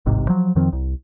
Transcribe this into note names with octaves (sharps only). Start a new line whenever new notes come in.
D#1 A1 G#2 C3
F3 F#3
F2 D#3 F3 C4
C2